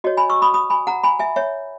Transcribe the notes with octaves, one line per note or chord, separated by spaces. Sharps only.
F#4 C#5 D#5
G#5 B5
C#6 E6
B5 D#6
B5 D#6
G#5 B5
F#5 A#5
G#5 B5
E5 G#5
C#5 E5